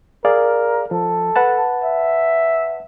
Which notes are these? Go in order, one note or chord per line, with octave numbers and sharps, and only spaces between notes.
G#4 A#4 D5 F5
F3 A4
B4 F#5 A5
E5